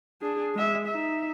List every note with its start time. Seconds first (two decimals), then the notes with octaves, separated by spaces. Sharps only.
0.22 D4 G#4
0.55 G#3 E5
0.87 D#4 E5